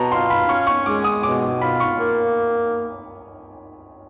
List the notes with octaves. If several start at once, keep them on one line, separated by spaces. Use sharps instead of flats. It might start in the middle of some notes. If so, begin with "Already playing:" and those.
Already playing: B2 A5 A#5
F4 C6
B5
C#4 C#6
C#6
G#3 D6
D#6
B2 D6
F4 B5
C#6
A#3